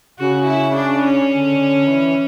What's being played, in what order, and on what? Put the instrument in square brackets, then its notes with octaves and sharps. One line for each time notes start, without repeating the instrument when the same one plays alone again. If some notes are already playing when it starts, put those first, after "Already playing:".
[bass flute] C#3 [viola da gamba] F#4
[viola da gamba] E4
D4
C#4
[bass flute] D3
D3
E3